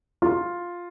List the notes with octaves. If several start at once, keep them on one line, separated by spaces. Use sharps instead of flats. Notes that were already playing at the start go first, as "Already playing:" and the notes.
F4